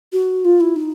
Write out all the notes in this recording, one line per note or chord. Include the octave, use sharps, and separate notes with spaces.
F#4
F4
E4
D#4